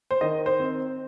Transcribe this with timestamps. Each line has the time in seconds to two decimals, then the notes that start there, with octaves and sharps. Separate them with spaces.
0.11 C5
0.21 D#3 D#5
0.46 C5
0.60 C4